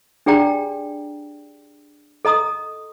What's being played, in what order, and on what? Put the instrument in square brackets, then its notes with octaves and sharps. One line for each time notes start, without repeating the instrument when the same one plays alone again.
[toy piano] D4 G4 G#4 D5 G5 A#5
A4 D#5 A#5 D#6